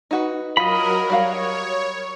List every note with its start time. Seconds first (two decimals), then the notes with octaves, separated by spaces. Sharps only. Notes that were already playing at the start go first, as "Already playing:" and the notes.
0.11 D#4 F#4 B4
0.57 F#3 F4 A#4 D#5 B5
1.10 G3 F#4 C#5 F5